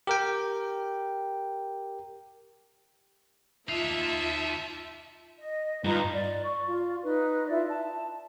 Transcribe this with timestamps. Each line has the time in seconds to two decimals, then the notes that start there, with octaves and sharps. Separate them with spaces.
0.07 G4 A#4 G5
3.69 D#4 F4 E5 F5 A5
5.38 D#5
5.84 G2 D#4 F4 B4
6.12 D5
6.44 D5 C#6
6.67 F4
7.03 D#4 B4
7.49 E4 F4 D5 E5
7.68 A5